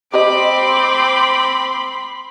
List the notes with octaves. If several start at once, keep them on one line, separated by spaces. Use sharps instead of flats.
C4 G4 C5 D#5 B5 C6 D6